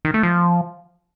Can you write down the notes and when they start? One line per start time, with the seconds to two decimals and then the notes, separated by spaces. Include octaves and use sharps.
0.05 D#3
0.14 A3
0.23 F3